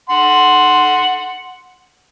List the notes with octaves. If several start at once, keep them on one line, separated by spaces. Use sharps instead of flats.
F#5 C6